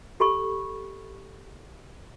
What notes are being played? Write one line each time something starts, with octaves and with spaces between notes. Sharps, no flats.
G4 A4 B5 C#6